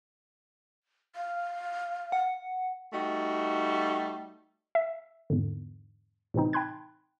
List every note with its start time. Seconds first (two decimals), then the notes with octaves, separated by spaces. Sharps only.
1.16 F5
2.12 F#5
2.92 G3 A3 D#4 F#4
4.75 E5
5.30 E2 G#2 D3
6.34 A2 C3 E3 C4 D#4
6.53 G5 A5 B5 C6 F#6 G#6